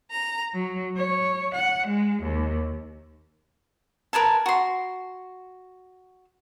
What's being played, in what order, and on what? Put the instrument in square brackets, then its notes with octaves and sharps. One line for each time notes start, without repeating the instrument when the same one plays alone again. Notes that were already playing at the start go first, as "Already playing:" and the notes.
[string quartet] A#5
F#3
C#5
F#5
G#3
D#2
[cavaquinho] A#4 B4 G#5 A5
F#4 C6